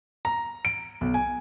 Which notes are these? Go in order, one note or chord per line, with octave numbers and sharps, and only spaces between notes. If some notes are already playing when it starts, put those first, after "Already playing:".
A#5
D7
B1
G#5